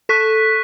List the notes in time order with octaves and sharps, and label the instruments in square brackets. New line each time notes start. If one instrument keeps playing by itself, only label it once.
[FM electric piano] A4 [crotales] C#6 F#6 B6